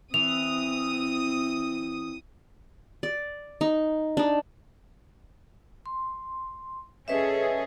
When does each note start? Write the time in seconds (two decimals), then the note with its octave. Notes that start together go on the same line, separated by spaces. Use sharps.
0.14 E3 C4 D#6 F7
3.03 D5
3.61 D#4
4.17 D4 D#4
5.86 C6
7.08 C#4 G#4 A4 B4 D#5 E5